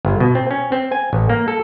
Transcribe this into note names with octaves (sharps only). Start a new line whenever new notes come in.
G1
B2
C4
C#4
C4
G#5
A1
A#3
A4